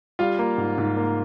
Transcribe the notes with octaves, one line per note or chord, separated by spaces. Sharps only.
G3 F4 F5
A#3
G#2
G#2
A#3